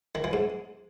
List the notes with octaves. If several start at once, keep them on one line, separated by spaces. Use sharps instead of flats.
D#3
E3
G#2